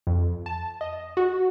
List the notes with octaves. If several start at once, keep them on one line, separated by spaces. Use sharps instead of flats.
F2
A5
D#5
F#4